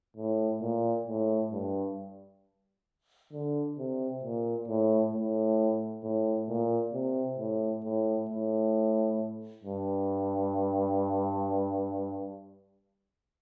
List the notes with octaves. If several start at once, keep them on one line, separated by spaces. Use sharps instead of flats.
A2
A#2
A2
G2
D3
C3
A#2
A2
A2
A2
A#2
C3
A2
A2
A2
G2